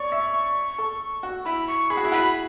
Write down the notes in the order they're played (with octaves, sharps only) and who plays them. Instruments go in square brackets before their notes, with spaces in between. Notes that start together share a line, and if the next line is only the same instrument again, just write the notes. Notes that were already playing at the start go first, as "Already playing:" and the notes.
Already playing: [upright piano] C#5 D5 [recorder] C#6
[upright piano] E5
A4
F#4
[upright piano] E4 [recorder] B5
[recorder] C#6
[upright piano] G#4 [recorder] B5
[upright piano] F#4
E4
[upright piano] F#4 [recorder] B5